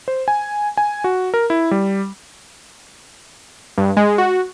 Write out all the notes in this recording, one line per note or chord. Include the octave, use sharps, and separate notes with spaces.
C5
G#5
G#5
F#4
A#4
E4
G3
G2
G#3
F#4